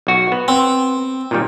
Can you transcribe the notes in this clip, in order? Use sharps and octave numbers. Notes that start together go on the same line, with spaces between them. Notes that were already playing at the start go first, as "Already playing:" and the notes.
B1 F#4
B3
C4
A#2 D#3 G3